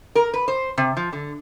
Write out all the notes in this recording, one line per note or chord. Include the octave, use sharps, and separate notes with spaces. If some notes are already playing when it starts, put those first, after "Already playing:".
A#4
B4
C5
C3
F3
D3